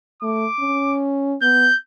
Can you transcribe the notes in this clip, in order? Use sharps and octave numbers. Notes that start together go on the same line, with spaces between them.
A3 D6
C#4
B3 G6